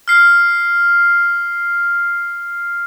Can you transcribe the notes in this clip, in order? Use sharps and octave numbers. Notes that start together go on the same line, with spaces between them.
F6 C7